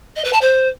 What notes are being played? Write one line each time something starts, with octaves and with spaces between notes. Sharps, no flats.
D#5
B4
A5
C5